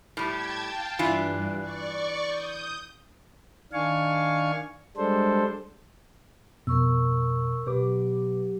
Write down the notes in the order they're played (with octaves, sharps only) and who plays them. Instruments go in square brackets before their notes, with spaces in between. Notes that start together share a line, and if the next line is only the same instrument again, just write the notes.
[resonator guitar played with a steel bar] A2 G3 [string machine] G5 A5 G#6
[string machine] F5 G5 A5
[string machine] G2 [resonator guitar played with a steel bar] E3 D4 F4
[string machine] D5 C#6
D#6 G6
[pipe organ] D#3 D4 F5 G#5 C#6
G3 G#3 D4 A4 C5
[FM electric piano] F2 B2 [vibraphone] A#4 C#6 E6
[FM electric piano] B2 B4 D6 [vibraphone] F#3 G4